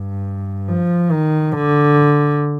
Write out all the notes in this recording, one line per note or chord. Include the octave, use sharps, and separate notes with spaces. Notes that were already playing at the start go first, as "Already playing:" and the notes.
Already playing: G2
F3
D#3
D3